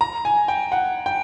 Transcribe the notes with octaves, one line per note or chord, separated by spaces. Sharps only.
A#5
G#5
G5
F#5
G5